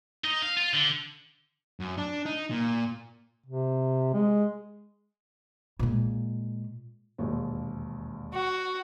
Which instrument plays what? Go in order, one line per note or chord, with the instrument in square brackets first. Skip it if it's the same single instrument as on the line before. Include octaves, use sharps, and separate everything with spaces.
[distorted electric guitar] D#4
F5
F4
D3
[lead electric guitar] F#2
D4
D#4
A#2
[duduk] C3
G#3
[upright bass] A#2 G#3
[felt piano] E1 A#1 D#2
[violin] F#4